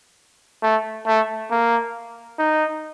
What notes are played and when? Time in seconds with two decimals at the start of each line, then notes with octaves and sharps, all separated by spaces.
0.63 A3
1.07 A3
1.51 A#3
2.39 D#4